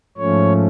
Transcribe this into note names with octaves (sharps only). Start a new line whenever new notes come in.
G#2 F3 A3 C#4 C#5